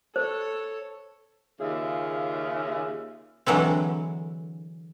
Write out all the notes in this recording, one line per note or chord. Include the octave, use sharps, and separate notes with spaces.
A4 C5 C#5
D#2 C#3 F4 G#4 E5
D3 E3 F#3 G#3 C4